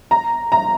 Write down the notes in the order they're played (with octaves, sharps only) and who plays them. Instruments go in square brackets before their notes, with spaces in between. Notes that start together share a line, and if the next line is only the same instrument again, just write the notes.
[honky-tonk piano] A#5
A#5